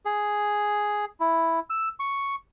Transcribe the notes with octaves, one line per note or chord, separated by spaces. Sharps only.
G#4
E4
E6
C#6